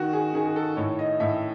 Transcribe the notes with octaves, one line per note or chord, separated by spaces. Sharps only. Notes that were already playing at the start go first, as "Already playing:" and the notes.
Already playing: D#3 F#4
G#4
D#3 G#4
G#4
A4
A2 C#5
D#5
A2 E5